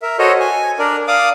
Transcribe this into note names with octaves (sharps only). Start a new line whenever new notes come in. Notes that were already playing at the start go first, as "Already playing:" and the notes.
A#4 E5
F#4 A4 C5 C#5 D#5
G#5
D4 A#4 D5
D5 F5 D6 D#6